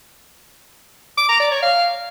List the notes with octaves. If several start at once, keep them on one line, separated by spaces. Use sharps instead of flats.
D6
A#5
D5
C#5
F5